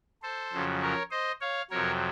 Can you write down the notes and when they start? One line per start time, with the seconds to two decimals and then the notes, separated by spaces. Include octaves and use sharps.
0.23 A4 C5
0.53 F2 C#3 F#3
0.82 A#4 C#5
1.11 C5 D#5
1.41 C#5 F5
1.71 F2 C3 F#3 A#4 C#5